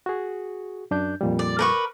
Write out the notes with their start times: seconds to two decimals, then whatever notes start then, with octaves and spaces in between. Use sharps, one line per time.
0.06 F#4 G#4
0.91 F#2 D4 G6
1.21 F2 A#2 G3
1.39 D5
1.59 A#4 B4 C#6